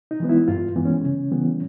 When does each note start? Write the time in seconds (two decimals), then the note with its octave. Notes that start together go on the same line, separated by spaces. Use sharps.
0.11 D#4
0.20 E3 G#3 B3
0.29 E4
0.48 G2 F4
0.76 E3 G#3 B3
0.85 C#4
1.04 C#3
1.31 E3 G3 B3